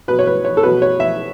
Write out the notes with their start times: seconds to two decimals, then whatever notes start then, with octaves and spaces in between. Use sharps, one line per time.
0.08 B2 F#3 B4
0.19 C#5
0.27 B4
0.45 C#5
0.57 A4
0.63 B2 F#3 B4
0.82 C#5
1.00 E5